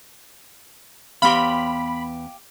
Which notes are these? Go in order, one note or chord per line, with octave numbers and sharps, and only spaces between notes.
E2 B3 G4 F5 B5 C6